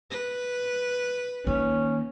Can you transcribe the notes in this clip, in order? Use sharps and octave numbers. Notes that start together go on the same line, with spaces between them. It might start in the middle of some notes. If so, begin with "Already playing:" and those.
B4
D#3 A#3 C#4